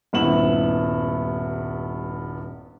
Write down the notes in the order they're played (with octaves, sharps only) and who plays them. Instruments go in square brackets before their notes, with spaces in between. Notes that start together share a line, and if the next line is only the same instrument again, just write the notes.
[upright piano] D#1 G2 B3 E4 E7 F#7